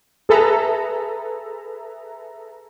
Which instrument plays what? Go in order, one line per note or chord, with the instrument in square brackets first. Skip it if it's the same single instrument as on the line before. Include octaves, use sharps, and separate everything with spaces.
[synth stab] G#4 A4 B4 E5 A#5